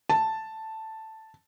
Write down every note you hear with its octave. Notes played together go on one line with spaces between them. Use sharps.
A5